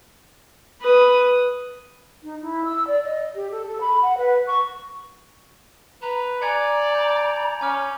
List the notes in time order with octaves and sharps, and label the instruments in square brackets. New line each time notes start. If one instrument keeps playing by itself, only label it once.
[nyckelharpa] B4 D#6
[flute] D#4
E4
E6
D5
D#5
G4
A4
A4
B5
F#5
B4
C#6
[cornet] B4 [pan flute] A#5
[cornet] D5 [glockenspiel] G#5 G#6 C#7 [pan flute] A#5
[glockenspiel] G6 F7
[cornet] C#4 [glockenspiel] G#5 D6 F6